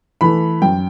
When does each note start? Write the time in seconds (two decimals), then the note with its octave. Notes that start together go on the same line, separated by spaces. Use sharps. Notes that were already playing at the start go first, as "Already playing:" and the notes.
0.21 E3 A3 B5
0.62 F#2 G5